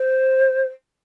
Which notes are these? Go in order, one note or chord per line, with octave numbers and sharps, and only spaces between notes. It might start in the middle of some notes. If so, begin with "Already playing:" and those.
Already playing: C5